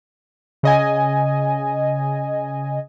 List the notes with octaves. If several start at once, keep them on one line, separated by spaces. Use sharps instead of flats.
C#3 D#5 G#5